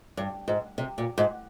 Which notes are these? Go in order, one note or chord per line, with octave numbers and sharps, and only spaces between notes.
G2
G#2
C3
A#2
G#2